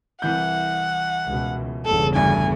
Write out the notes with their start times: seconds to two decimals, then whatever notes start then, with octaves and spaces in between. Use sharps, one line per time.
0.22 C2 E3 F#5 G6
1.25 C#2 B2
1.86 G1 E2 C#3 A4
2.15 D2 G2 D4 G#5